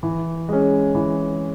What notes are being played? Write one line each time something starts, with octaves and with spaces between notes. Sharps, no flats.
E3
G#3 C#4
E3